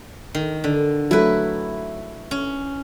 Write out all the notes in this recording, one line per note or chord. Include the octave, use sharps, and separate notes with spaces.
D#3
D3
F#3 A3 E4 B4
C#4